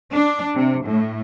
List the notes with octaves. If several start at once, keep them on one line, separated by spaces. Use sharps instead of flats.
D4
C3
A2